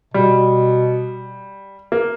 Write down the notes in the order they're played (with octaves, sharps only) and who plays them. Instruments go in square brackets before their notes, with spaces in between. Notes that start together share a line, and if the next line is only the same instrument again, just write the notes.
[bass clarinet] B2 [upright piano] G3
[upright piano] A#3